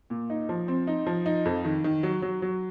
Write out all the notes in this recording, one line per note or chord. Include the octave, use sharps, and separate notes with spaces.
A#2
D#4
F3
C4
D#4
F3
D#4
F2
D#3
D#3
F#3
F#3
F#3